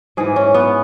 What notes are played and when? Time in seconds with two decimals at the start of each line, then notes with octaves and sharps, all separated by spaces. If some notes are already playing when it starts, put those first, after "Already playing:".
0.17 G#2 E3 G#4
0.36 C#4
0.54 B3